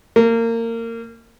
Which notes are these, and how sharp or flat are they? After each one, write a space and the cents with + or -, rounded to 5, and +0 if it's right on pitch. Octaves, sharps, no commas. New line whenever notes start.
A#3 -25